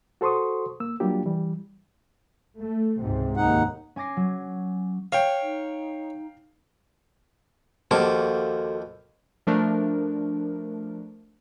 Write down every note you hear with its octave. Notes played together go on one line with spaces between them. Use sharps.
F#4 A4 C5 C6 C#6 D#6
A#3 E6
F#3 G3 A#3 D4 F4 G4
E3 G3
A3
C#2 G#2 C3
D#2 D#4 F#5
C#4 G#5 D6 A#6 C7
F#3
C#5 F5 G5
D#4
D#2 F3 F#4 A4 C5 D6
F3 A3 D4 A#4